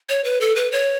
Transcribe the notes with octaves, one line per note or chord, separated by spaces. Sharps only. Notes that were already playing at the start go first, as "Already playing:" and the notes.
C#5
B4
A4
B4
C#5